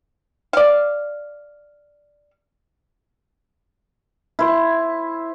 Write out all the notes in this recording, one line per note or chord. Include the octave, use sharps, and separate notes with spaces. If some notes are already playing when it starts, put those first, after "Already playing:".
D5 F5
E4 C5